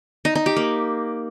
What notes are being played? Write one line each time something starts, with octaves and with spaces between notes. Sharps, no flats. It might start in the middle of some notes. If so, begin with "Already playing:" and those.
D#4
D#4
G4
A#3